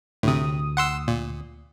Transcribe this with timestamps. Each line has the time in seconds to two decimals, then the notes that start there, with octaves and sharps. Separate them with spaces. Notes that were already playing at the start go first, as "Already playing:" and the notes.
0.23 D2 A2 C3 D#6
0.77 F#5 C6 E6
1.08 A#2